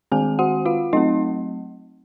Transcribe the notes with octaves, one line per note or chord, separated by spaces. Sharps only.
D#3 G#3 C4 G#4 G#5
F#4 F#5
F4 F5
F#3 A3 C4 D#4 D#5